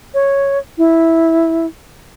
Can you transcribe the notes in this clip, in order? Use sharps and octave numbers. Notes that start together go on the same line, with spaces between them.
C#5
E4